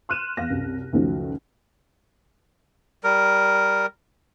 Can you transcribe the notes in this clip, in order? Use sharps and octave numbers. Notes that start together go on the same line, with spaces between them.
C6 F6 F#6 D#7 E7
E2 F5 A#6
C2 F#2
C#2 F#2 D#3 F3 F#3 A3
G3 A#4